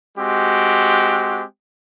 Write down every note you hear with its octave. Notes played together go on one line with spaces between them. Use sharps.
G#3 C4 F#4 G4